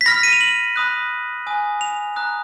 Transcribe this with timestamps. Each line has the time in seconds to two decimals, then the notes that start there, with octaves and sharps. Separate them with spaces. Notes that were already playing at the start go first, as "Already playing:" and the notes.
0.01 B6
0.06 B5 F6 A#6
0.14 B6
0.23 D#7
0.33 F7
0.41 F#7
0.76 B5 D#6 F#6
1.47 G#5 D#6 F#6
1.81 F7
2.16 A#5 D#6 F#6